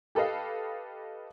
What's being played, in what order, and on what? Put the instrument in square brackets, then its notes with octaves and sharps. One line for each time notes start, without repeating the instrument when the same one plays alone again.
[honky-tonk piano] G4 A4 B4 D#5 F5